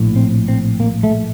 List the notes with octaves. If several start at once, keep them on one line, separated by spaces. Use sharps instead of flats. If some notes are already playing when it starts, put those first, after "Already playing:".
Already playing: A#1 A2
C4
C4
A#3
A3